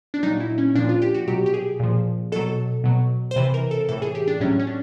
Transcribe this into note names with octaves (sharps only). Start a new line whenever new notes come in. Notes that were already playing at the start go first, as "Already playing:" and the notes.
D4
A#2 F#3 D#4
E4
C#4
A#2 F3 D4
F4
G4
F#4
B2 F#3 G4
G4
G#4
A#2 F3
B2 F#3 A4
B2 F#3
C5
C3 E3 B4
A#4
A4
A2 E3 A4
G#4
G4
D4
A2 F#3 C#4
C#4
D4